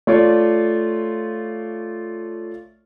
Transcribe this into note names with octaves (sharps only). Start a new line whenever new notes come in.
A3 F4 C#5 D5